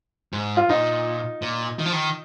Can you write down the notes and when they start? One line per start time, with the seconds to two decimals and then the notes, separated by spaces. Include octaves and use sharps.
0.33 G#2
0.57 F4
0.69 A#2 D#4
1.42 A#2
1.79 D#3
1.86 F3
1.93 D#3